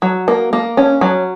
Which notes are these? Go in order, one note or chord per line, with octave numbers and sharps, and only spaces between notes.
F#3
A#3
A#3
C#4
F#3